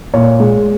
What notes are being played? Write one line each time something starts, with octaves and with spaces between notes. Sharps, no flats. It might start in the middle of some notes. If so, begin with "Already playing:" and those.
A#2 C#5
G#3